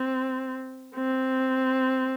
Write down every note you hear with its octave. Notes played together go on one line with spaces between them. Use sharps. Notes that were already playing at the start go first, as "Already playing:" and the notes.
Already playing: C4
C4